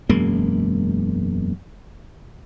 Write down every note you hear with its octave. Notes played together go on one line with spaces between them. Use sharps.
E1 F#2 G#3 A#3